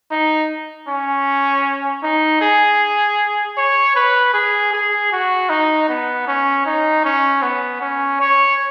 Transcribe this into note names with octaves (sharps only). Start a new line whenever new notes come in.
D#4
C#4
D#4
G#4
C#5
B4
G#4
G#4
F#4
D#4
B3
C#4
D#4
C#4
B3
C#4
C#5